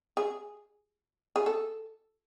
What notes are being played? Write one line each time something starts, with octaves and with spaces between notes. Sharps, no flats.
G#4
G#4
A4